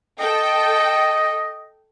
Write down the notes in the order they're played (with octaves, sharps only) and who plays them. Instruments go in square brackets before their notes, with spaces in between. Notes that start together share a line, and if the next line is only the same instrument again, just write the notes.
[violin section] A4 G5 [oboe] D#5